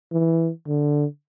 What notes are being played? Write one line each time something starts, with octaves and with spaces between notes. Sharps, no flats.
E3
D3